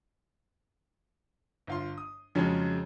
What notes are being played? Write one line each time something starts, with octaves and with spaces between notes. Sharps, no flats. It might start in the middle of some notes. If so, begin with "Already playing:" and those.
G1 F4 C6
D#6
F2 C#3 F3 F#3 G#3 C#4